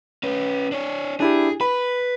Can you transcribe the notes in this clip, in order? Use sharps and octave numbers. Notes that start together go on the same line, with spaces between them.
C#4 B4
D4 C#5
D4 E4 G4 G#4
B4 B5